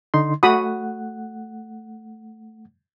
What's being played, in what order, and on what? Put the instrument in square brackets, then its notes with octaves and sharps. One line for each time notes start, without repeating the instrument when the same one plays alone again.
[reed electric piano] D3 D#4 C6
[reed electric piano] A3 F#5 [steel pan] F#4 B5 D#6